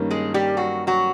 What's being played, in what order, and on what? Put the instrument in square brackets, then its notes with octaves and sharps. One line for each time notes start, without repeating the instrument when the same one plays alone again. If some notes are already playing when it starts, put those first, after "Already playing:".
Already playing: [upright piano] G2 D#3 G3 A#3 C#4
[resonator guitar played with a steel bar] G#3 G#4
G3 G4
F#3 F#4
F#3 F#4